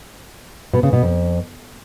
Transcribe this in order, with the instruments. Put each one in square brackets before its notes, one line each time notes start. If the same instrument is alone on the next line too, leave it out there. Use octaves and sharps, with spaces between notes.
[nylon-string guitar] B2
C#3
B2
F2